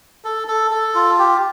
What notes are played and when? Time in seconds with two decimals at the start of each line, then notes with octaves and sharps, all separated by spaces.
0.25 A4
0.48 A4
0.71 A4
0.95 F4
1.19 G4